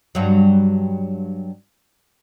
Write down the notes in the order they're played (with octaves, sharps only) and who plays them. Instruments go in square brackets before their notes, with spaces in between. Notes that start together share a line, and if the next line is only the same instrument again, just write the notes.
[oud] G2 F#3